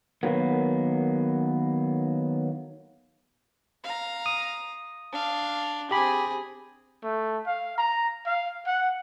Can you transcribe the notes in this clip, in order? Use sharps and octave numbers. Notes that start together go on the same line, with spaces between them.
D#3 F#3 A#3 B3
F5 A#5
D#6
D4 F5
C4 G4 G#4 B5
A3
F5
A#5
F5
F#5